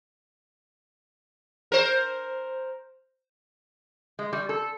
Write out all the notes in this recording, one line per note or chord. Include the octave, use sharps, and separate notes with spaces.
A#4 C5
G#3
G3
A4